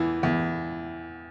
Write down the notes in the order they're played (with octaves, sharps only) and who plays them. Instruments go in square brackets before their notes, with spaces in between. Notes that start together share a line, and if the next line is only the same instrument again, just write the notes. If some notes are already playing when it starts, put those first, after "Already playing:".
Already playing: [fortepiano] E2 E3
E2